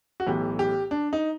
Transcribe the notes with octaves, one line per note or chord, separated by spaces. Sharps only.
F#4
B1 A2 E3 G4
G4
D4
D#4